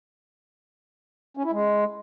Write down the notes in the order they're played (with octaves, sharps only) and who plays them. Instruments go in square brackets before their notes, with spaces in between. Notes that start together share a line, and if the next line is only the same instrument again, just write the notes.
[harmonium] C#4
E4
G#3